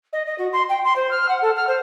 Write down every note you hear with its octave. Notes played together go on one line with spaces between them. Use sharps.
D#5
D#5
F#4
C6
G5
C6
C5
F6
F#5
A4
F6
C5